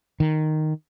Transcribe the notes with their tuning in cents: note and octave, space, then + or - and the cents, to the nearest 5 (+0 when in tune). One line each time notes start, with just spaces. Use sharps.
D#3 -5